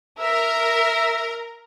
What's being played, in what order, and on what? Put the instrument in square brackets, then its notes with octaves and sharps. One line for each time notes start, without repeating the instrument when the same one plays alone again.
[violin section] A#4 [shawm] E5